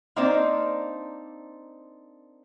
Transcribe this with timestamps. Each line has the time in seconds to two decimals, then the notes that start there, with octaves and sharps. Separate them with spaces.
0.16 A#3 C4 D4 D#4 C5 D5